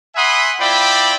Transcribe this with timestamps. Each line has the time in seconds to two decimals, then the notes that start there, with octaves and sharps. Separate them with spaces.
0.16 E5 F#5 G#5 B5 C6 D#6
0.60 C4 E4 F4 D5 G5 B5